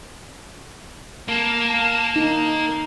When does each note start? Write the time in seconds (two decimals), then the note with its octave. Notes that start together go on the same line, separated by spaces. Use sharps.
1.28 A#3 A5
2.16 D#4